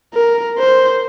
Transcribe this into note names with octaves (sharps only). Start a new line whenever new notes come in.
A#4
C5